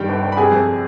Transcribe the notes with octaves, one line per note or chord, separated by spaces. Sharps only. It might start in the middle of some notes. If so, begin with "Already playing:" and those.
Already playing: G2 D#3 G4 G5
G1
G1
B5
C3 G#4 G#5
F2